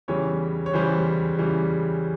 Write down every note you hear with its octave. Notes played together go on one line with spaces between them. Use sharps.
E2 C#3 E3 G3 C#5
C#5
E2 C#3 E3 G3 C5
C#3 E3 G3